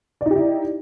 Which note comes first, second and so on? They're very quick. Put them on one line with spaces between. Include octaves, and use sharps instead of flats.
D5 D#4 G4 E4